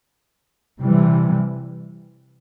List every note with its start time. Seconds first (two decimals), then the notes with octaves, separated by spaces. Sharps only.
0.80 C3 E3 G3